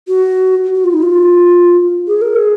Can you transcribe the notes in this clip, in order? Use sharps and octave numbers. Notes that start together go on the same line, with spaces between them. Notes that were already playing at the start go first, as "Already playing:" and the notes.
F#4
F#4
F4
D#4
F4
G#4
A#4
G#4